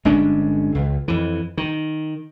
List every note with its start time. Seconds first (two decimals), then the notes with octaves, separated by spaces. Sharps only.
0.05 G1 G#3 C#4 D4
0.75 C#2
1.08 F2 E3
1.57 D#3